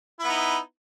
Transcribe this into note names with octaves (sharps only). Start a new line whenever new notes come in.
B3 D#4 E4